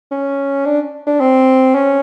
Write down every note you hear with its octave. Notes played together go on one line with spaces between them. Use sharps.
C#4
D4
D4
C4
C#4